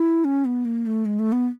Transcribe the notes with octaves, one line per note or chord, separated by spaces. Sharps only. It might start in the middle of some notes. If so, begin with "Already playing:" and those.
Already playing: E4
C#4
B3
A#3
A3
G#3
A3
B3